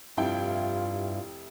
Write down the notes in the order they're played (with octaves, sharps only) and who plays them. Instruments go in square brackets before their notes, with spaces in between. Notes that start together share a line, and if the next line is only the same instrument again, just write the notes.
[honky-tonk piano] F1 E4 G5 [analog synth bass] G2 [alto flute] F4